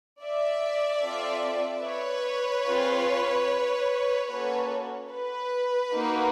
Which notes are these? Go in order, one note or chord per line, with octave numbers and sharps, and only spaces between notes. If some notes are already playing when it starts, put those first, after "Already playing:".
D5 E5
C4 F4 A4
B4 C#5
C4 F4 G#4
A#3 C#4 F#4 A4 B4 C#5
B4
A#3 D#4 F#4